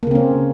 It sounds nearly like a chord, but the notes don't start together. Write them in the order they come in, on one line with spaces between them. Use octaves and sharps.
A#3 C#3 C4 C#4